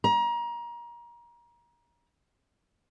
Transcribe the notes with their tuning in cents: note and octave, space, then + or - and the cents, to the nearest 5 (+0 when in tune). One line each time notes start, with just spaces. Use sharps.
A#5 +30